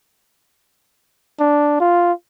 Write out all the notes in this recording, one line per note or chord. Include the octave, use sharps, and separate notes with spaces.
D4
F4